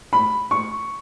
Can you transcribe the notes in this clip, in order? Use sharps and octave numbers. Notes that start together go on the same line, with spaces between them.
B5
C#6